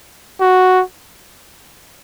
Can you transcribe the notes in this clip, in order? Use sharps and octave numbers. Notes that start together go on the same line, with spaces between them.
F#4